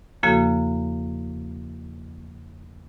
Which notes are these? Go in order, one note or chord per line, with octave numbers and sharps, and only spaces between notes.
E2 C#3 F3 A#3 F#4 A4